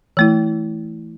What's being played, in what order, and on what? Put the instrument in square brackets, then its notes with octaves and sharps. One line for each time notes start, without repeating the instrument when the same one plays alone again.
[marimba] E3 A3 E4